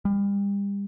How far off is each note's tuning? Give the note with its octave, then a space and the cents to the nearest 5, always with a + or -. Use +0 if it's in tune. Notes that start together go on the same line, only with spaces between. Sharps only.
G3 +35